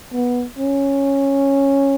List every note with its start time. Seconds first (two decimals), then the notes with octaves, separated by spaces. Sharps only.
0.13 B3
0.58 C#4